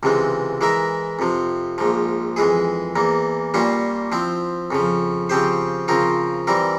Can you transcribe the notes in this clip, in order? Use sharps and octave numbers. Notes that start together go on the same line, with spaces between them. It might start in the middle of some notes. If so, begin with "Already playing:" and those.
C#2 C3 E3 G#3
E3 G#3 E4 A#4 E5
F2 C3 F3
A#1 G#2 F3
F2 E3 G#3 E4 G#4
E2 E3 A#3
A#2 G3 A#3 C#4 F4
F3 C4 E4
F2 C#3 F3
C#3 F3 C4 G4 C5
C#3 F3 C4 F4 A#4
E3 G3 C4 E4 A#4